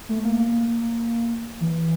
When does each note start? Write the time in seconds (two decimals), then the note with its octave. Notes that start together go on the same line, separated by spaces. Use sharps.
0.09 A3
0.24 A#3
0.39 A#3
1.61 E3